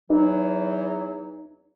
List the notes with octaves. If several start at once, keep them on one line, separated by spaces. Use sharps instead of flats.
E2 E3 F#3 D#4